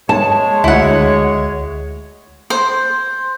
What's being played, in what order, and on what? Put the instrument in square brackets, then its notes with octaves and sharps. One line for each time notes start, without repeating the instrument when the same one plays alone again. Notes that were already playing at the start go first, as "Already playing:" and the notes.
[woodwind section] G#3 C#5 [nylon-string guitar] A5
[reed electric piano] D2 [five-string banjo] E4 F#5
[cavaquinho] C5